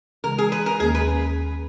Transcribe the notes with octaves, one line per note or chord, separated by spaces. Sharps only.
C#3 E3 G#3 A#4
G#4
B4
A#4
D#2 D#3 A#3 C#4 G#4
B4